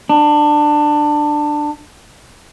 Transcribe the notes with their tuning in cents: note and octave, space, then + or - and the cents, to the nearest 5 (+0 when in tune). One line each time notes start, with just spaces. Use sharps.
D4 +20